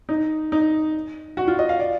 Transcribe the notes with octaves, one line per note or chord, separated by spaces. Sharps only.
D#4
D#4
F#4
F4
D#5
F5
D5